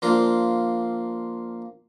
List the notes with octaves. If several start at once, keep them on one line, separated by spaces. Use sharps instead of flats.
F3 A#3 D4 F4